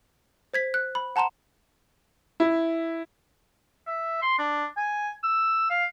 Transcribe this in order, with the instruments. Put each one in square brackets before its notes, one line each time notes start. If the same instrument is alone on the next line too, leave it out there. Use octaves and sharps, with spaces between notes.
[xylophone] C5 G#6 B6
F#6
B5
F#5 A5 A#5 C6 E7
[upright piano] E4
[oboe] E5
C6
D4
G#5
E6
F5